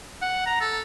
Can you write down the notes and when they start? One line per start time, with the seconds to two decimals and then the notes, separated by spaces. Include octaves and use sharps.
0.22 F#5
0.46 A#5
0.60 A4